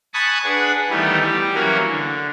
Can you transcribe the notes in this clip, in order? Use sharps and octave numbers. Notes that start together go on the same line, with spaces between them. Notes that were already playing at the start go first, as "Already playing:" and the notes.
G#5 A5 B5 C#6 D#6 F#6
D4 G#4 B4 F#5
D#3 E3 G3 A3 B3 D#4
G3 G4
E3 F#3 A#3 C#4 F#4 A#4
D3